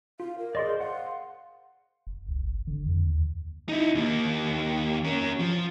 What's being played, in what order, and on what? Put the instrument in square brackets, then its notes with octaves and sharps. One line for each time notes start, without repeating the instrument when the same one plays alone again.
[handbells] F4 [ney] F5
[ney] A#4
[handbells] G#4 D#5 [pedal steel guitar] D5 C6
[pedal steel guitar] C5
[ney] F5 [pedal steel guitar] F#5 C6
[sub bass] F1
C#2
G1
D3
F2
D#2
[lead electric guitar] D#4 E4
D#2 A#3
C#4 A#4
F3